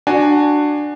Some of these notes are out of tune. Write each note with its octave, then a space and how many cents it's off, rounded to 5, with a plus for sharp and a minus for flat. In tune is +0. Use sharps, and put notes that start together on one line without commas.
D4 +10 F#4 +0 G#5 +0